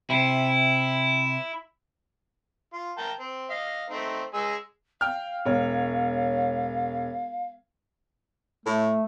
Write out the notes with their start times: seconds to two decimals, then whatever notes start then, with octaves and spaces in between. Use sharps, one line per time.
0.10 C3 E4
2.73 F4
2.98 A#4 G5 A5
3.20 C4
3.50 D#5 F5
3.90 A3 C4 D#4
4.34 G#3 G#5 E6
5.01 F5 G5 F6
5.46 E1 C#5
8.66 A2 A3